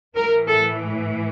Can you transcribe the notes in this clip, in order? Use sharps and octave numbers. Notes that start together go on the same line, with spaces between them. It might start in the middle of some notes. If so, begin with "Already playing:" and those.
A2 E3 A#4
A4